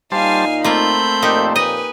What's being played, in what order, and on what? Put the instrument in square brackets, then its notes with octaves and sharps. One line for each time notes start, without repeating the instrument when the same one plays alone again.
[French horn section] A#2 D#4 [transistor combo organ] G3 C5 A5 [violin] F5 G#5
[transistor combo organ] A3 C4 [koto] A#3 F4 [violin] B5 G6
[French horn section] F2 A#2 [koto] A#3 D#4 G4
[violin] B4 G#5 [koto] D#5